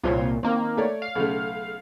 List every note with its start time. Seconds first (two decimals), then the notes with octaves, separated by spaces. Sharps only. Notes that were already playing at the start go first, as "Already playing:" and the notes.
0.03 C2 A#2 F4 C5 C#5
0.43 D#3 A#3 C4
0.77 A3 C#5 D5
1.02 F5
1.15 B1 C#3 A3